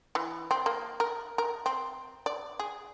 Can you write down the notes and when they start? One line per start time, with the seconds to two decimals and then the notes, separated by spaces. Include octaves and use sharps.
0.15 E3
0.51 C4
0.66 A#3
1.00 A#4
1.38 A#4
1.66 C4
2.26 D5
2.59 G#4